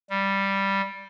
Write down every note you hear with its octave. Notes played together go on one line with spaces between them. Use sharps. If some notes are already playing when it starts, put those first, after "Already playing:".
G3